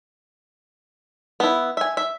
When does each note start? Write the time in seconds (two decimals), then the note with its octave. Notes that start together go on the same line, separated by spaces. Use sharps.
1.40 B3 E4
1.77 E5 G#5
1.97 E5